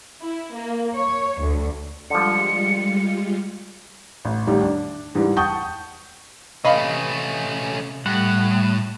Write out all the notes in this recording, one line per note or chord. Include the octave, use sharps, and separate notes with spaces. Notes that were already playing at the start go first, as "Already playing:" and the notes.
E4
A#3
C#5
D2
D3 F3 G3 G#3 F4 C#7
A1
A1 D#3 G3
D4
G#2 E3 G3
F#5 G5 A5 C#6 D#6 G6
C3 A3 C#4 B4 D#5 F5 B5
A2 G3 F#5